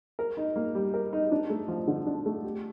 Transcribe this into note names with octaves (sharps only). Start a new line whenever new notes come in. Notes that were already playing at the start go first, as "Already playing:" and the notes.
A#4
D#4
A#3
G3
A#4
D#4
D4
A3
F3
D3
D4
A3
G4